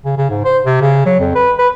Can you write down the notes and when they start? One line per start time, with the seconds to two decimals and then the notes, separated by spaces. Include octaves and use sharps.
0.05 C#3
0.17 C#3
0.30 G#2
0.44 C5
0.66 C3
0.81 C#3
1.06 F#3
1.20 F2
1.35 B4
1.59 B4